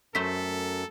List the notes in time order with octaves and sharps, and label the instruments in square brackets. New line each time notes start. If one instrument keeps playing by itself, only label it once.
[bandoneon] F#2 [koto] F#3 A3 C5 [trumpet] A4 [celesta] B6